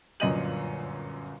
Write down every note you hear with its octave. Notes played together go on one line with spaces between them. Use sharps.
G1 F#2 A#2 D#5 D#7 F#7